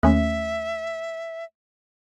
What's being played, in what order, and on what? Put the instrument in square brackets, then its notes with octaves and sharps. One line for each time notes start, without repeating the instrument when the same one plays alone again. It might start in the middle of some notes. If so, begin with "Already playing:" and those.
[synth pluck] D#2 C#4 [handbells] A3 [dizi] E5